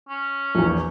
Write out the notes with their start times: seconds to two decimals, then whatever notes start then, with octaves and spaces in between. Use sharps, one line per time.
0.09 C#4
0.55 A#1 E2